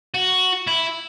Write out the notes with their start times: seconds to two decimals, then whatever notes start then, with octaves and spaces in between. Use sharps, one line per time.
0.15 F#4
0.67 E4